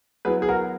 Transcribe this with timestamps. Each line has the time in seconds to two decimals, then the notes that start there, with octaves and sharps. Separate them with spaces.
0.25 F#3 B3 E4 G#4 B4
0.42 G#4
0.49 F#4 A#4